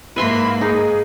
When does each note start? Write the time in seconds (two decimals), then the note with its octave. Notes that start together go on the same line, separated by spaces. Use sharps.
0.16 G#2 A#3 B4 E5 B5 C6
0.61 D#4 G#4